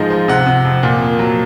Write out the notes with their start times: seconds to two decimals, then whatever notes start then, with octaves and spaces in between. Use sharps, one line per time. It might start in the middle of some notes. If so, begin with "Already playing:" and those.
Already playing: G#2 F3 G#3 D#5
0.10 F3
0.28 C3 F#5
0.46 C3
0.65 F2
0.83 A#2
1.01 A#3
1.19 F#3